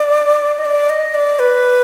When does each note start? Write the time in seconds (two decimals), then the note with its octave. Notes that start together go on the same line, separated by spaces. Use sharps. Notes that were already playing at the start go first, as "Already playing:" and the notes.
Already playing: D5
0.58 D#5
0.65 D5
0.90 D#5
1.14 D5
1.39 B4